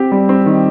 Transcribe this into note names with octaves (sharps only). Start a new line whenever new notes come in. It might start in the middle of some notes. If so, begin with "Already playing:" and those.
Already playing: C4 G4
G3
C4
D#3